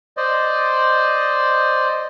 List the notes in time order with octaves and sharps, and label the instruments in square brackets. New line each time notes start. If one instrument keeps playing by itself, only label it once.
[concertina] C5 D5 D#5